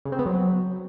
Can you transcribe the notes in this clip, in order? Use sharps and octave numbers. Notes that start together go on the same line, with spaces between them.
C#3
C4
B3
F#3